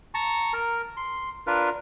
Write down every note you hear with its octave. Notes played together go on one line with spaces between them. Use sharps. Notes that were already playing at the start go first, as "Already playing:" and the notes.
A5 A#5 C#6
A#4
C6
D4 F4 A#4 B4